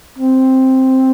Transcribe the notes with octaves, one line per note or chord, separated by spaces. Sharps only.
C4